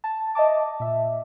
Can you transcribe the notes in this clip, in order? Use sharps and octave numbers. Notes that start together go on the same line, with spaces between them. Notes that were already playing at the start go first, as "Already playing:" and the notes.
A5
D#5 E5 A5 D6
A#2 E5